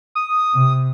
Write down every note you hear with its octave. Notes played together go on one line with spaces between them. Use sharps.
D#6
C3